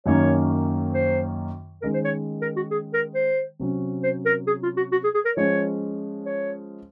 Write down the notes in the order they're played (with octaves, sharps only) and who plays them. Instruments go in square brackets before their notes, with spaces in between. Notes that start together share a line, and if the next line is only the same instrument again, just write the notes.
[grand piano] F#2 D#3 F#3 A#3 C#4 [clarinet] C#5
[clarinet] C5
[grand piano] D#3 G#3 C#4 [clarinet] A#4
[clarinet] C5
C#5
A#4
F#4
G#4
A#4
C5
[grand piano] C3 F#3 C#4
[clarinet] C5
A#4
G#4
F4
F#4
F#4
G#4
G#4
A#4
[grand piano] F3 G#3 C#4 [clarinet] C#5
[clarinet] C#5